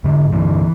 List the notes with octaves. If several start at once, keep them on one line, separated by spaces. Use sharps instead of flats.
G#2 D3
G2 D3 E3